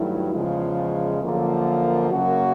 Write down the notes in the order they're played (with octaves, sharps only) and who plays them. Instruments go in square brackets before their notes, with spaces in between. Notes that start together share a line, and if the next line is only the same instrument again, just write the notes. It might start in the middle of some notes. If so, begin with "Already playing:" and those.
Already playing: [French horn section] G2 D#3 F#3 A3 E4
E2 C#3 F3 G#3
F#2 D3 F3 A#3
F#2 C#3 F#3 A#3 F#4